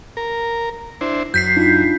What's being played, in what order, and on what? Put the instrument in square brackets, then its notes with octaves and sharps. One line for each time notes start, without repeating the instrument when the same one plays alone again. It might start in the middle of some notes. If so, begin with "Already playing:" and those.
[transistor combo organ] A#4
D4 E4 C5
[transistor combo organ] F#2 [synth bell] G6 B6 C7
[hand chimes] D4 D#4 F4